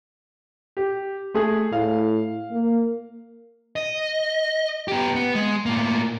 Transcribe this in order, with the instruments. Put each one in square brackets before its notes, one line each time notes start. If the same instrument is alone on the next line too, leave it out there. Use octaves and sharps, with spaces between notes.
[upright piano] G4
A3 G#4
[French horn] A2 [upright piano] F5
[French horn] A#3
[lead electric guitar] D#5
B3 G4
B3
G#3
A2 A#3